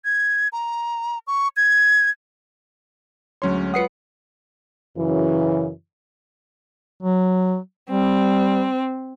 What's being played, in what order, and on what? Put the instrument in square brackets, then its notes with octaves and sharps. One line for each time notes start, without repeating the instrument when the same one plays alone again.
[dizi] G#6
A#5
C#6
G#6
[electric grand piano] D2 C#4 C6 [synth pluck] F#3 G#3 C#5
[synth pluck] F4 B4 F#5 [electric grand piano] D#6 C7 C#7
[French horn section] F#2 C#3 E3
[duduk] F#3
[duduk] G3 [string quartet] C4